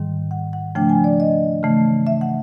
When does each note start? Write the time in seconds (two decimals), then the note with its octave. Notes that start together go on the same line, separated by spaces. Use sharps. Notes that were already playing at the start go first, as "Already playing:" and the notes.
Already playing: G#2 D#3 G3
0.31 F#5
0.53 F#5
0.75 C#3 F3 A3 D4 G5
0.89 G#5
1.04 D5
1.20 D#5
1.63 C#3 E3 A3
2.07 E5
2.21 F#5